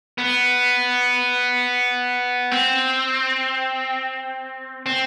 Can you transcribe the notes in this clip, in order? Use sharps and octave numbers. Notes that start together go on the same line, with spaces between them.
B3
C4
C4